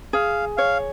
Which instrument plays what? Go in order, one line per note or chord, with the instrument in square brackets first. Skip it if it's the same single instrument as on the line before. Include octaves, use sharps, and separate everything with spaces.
[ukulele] G#4 [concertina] F5
[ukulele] C#5 [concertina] F5